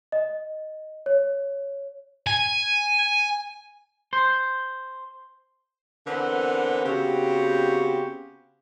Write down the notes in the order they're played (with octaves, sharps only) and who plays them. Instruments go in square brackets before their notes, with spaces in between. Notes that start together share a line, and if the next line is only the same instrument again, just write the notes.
[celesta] D#5
C#5
[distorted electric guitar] G#5
[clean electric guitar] C5
[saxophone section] D3 E3 B3 C4 A#4 B4
C#3 B3 C4 F#4 G4